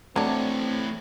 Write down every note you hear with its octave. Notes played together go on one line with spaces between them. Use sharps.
E3 F#3 A3 C4 D4 C#5